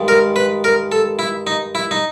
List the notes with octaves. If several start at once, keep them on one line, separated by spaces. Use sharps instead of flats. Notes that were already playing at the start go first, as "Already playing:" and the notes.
Already playing: G2 D#3 G#3
A#4
B4
A#4
A4
E4
D#4
E4
D#4